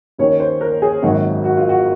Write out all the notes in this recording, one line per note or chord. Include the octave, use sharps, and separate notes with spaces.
D#2 D#3 A#3 C#4 C#5
C5
A#4
G#4
G#1 F#2 D#3 A#3 F#4
F#4
F4
F#4